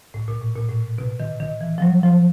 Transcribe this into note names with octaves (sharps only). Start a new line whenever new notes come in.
A2
A#2
A2
A#2
A2
B2
D#3
D#3
E3
F3
F#3
F3